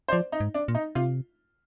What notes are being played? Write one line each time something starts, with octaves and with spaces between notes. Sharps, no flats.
C5
F3 D5
D#4
G#2
D4
A#2
D#4
C3 F4